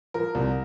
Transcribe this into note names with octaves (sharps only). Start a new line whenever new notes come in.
F3 A#4
C2